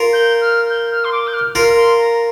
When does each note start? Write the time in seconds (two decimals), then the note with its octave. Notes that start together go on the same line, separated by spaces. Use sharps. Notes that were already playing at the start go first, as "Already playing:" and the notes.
Already playing: F4 A#4
0.13 G6
0.41 F6
0.70 G6
0.91 F6
1.04 C6
1.12 D6
1.27 G6
1.34 F6
1.55 F4 A#4 F6
1.76 C6
1.98 A#5